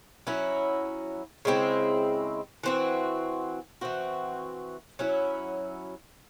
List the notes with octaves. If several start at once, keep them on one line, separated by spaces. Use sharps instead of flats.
F#3 C#4 E4
C#3 G#3 C4 E4
E3 C4 F#4
E3 C4 F#4
F#3 C#4 E4